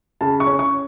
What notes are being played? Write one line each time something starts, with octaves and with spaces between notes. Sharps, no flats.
C#3 A5
C#6
C#4
C#6